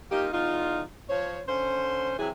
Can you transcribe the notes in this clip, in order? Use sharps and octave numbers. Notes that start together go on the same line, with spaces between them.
A#3 D#4 F4 G4
E2 D#4 F4
F3 C5 C#5
D3 C#4 C5
C3 E3 F#3 E4 G#4